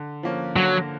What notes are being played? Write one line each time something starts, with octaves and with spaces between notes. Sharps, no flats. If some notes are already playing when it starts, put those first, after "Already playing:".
Already playing: D3
F3 A#3 C#4
D3 F#3